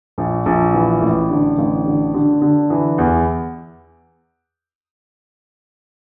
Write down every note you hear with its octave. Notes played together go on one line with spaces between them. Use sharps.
A#1
A#1
E3
A1
D3
A1
D3
D3
D3
E3
E2